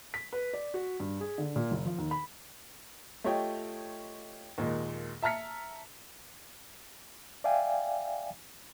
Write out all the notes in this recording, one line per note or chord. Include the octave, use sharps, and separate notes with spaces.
B6
B4
D5
F#4
G2
G#4
D3
A#2
F#1
F3
D#2
B5
A3 F4 G4 C#5 D#5 G5
D#2 A#2 G#3
E5 A5 A#5 F6 B6 C#7
D5 E5 F5 G5 G#5